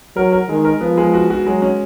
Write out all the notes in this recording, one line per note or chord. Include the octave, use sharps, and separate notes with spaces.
F#3 A#4
A#4
D#3 G#3
A#4
F3 B3
G#3
F#4
F#4
F#3 G#3
C#4